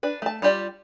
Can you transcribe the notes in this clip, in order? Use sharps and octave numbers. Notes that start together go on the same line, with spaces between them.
D4 B4
A3 A5
G3 F4 G4 D5